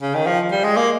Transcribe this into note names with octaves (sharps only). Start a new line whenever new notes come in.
C#3
D#3
F3
G3
G#3
A#3